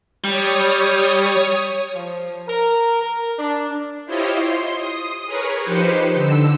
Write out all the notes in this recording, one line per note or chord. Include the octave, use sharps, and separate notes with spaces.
G3 C#5 D#6
F3
A#4
A#4
D4
E4 F4 G4 C5 C#5 D#5
C6
D#6
G#4 A#4 B4 C#5
F3 D#4 G4 B4 C5 C#7
D3 E6